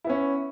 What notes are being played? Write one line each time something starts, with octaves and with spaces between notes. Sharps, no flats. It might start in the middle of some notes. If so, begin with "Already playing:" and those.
B3 C#4 E4